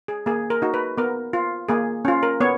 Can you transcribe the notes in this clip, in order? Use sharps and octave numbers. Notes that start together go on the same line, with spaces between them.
G#4
A#3 G#4
A#4
D#4 F#4
B4
B3 A#4
F4
A#3 G#4
C#4 F4
A#4
B3 C#5